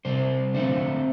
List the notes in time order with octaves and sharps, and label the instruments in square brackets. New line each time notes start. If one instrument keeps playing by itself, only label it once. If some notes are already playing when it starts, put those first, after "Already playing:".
[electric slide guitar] C3 G3 C4 C5
D3 A3 C4 C5